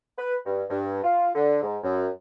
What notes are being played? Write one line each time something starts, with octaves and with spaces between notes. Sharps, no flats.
B4
G2
G2
F4
D3
G#2
F#2